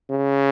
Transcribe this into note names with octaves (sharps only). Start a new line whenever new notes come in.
C#3